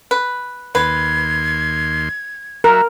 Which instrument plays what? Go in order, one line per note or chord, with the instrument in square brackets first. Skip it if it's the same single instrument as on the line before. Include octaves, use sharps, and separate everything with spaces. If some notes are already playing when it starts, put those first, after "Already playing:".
[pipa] B4
[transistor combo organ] D#2 C6 [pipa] B4 [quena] G#6
[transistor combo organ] F#3 F#4 E5 [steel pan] A#4